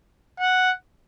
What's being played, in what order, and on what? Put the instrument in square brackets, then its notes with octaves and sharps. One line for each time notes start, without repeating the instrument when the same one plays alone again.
[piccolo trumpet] F#5